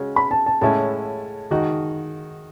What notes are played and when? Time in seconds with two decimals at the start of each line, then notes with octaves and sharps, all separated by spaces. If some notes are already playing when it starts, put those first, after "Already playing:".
Already playing: C#3 G#3 C#4 F#4
0.16 B5
0.31 A5
0.46 A5
0.61 A2 G#3 C#4 E4 A5
1.50 D#3 G#3 D#4 F#4